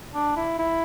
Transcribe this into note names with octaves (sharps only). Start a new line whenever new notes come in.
D4
E4
E4